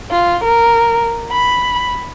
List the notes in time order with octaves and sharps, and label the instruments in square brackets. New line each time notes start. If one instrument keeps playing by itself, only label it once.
[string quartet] F4
A#4
B5